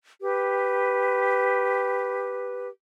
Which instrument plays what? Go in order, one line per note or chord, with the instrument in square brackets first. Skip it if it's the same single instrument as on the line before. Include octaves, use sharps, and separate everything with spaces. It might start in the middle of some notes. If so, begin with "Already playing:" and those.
[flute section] G4 B4